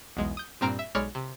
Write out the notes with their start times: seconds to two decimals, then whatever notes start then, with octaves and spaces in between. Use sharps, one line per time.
0.17 B1 E2 G#3
0.37 D#6 G6
0.61 G2 A#2 C4 A#5 F6 D7
0.79 E5
0.95 B1 G#3 C#5 D5 B5 F6
1.15 C3